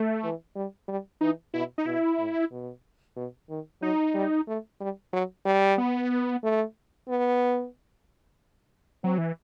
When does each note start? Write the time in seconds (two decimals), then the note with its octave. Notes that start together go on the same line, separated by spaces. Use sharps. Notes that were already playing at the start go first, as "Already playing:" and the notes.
Already playing: A3
0.24 E3
0.56 G3
0.88 G3
1.21 E3 D#4
1.54 B2 E4
1.78 D#4
1.86 B2 E4
2.19 A2
2.51 B2
3.16 B2
3.50 D#3
3.82 F#3 D#4
4.15 G3
4.48 A3
4.80 G3
5.13 F#3
5.45 G3
5.78 B3
6.43 A3
7.08 B3
9.04 F#3 C4
9.18 E3